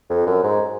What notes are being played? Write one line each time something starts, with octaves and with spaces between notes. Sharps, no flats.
F2
F#2
G#2